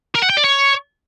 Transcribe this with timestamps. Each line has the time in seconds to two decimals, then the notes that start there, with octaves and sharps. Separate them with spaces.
0.15 A#4
0.22 F#5
0.30 G5
0.37 D5
0.44 C#5